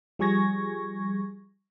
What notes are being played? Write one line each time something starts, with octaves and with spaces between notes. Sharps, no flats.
F3 G3 G#4 C#6 G#6 A#6